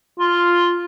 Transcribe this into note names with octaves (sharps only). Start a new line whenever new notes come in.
F4